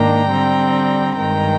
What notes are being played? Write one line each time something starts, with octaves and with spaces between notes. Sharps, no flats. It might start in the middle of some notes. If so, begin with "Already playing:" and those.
Already playing: G#2 D#3 A#3 D4 G5 A#5
D3 G3 C4
G2 D#3 G#3 G5 A#5